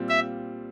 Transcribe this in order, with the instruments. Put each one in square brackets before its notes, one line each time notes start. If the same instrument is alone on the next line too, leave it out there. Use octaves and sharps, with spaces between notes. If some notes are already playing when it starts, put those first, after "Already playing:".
Already playing: [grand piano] A#2 G3 C4 F4
[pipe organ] E5